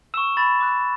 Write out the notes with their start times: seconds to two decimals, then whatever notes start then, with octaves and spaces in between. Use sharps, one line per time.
0.14 C#6 E6 E7
0.37 B5 A6
0.60 D6 F#6